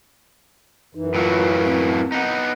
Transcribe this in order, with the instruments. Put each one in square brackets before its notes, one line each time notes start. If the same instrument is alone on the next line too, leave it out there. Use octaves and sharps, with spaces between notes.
[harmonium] F#2 E3 [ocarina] D#4
[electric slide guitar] A2 F#3 A#3 [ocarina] F4
[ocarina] C4
[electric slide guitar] B3 D#4